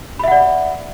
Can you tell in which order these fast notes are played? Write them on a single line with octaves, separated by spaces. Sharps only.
B5 E5 F#5 D5